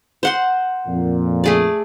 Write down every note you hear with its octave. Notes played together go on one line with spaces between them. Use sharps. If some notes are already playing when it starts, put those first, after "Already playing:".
C5 F#5 C6
F2 A#2
A3 G#4 D5